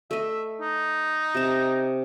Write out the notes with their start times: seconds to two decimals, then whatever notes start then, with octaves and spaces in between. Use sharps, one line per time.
0.11 A3 D#5 E5
0.61 D#4
1.35 C3 A5